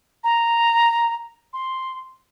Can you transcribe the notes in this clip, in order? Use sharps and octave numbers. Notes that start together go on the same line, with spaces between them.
A#5
C6